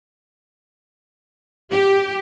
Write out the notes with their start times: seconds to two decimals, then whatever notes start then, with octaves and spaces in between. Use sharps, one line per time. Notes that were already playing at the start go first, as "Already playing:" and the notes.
1.71 G4